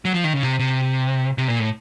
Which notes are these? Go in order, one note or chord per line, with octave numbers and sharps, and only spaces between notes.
F#3
F3
D#3
C#3
C3
C3
C3
A#2
A2